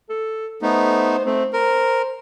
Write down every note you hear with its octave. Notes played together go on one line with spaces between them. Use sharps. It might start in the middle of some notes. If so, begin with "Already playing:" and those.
A4
A3 B3 D#4 C5
A3 C4
A#4 C5